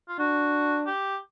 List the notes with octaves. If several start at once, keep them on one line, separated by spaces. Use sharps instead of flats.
F4
D4 F#4
G4